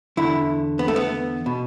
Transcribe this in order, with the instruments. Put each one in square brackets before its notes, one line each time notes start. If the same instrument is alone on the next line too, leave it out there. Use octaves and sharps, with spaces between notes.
[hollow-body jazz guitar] E2 D3 E4
B3
A3
B3
B2